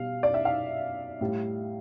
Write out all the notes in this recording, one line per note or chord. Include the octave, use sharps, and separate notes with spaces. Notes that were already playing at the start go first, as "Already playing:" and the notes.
Already playing: B2 G3 F5
D5
E5
F5
A2 G3